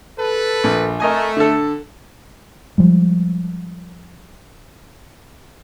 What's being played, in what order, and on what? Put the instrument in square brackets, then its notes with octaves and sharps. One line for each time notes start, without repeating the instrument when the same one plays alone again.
[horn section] A4 B4
[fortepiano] A#1
[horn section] A3 [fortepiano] A#4 D#5 G#5
[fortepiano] D3 A4
[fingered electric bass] F3 G3 G#3